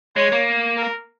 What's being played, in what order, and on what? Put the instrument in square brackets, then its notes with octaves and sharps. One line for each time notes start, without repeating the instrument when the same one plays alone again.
[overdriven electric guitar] G#3 [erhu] C#5
[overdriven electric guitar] A#3
[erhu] A#4